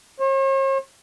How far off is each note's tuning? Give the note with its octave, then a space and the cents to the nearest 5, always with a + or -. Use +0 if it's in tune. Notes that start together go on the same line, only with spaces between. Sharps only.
C#5 -45